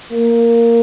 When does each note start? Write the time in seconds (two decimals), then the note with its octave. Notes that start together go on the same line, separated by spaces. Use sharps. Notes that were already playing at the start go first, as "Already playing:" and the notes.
0.13 A#3